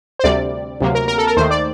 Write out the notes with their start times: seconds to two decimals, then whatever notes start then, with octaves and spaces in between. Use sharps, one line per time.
0.19 C5
0.24 D2 C3 G3 D5
0.81 D2 C3 F#3 A#3
0.95 A#4
1.08 A#4
1.18 A4
1.27 A#4
1.37 D#2 D#3 A3 C5
1.51 D5